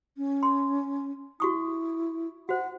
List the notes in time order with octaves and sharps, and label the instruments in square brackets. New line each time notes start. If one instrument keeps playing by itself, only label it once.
[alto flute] C#4
[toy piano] C6
[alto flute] E4 [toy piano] F#4 C#6 D#6
[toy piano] F#4 C5 [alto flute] F#5